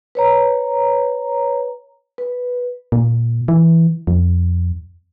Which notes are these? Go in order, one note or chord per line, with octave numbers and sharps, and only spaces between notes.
B4 C#5 A#5
B4
A#2
E3
F2